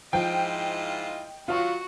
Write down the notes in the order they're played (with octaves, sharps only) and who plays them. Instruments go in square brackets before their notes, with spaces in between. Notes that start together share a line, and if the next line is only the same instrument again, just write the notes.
[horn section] G#2 E4 F4 [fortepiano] F3 [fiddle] D#5 [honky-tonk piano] G5
[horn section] F#3 [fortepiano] F4 F5 [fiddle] F#4